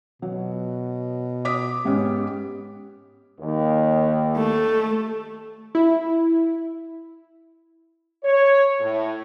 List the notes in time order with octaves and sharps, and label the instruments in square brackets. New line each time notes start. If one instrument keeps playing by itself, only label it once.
[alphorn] B2 [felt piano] F#3
[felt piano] D6 D#6 B6
[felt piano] G#2 B3 C#4 [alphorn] G4
[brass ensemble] D#2
[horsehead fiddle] A3
[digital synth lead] E4
[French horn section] C#5
A2